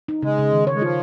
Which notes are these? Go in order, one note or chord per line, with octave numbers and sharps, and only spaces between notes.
D#4
C#3 G#3
C#3
D#3
C#5
G#3
F3 F4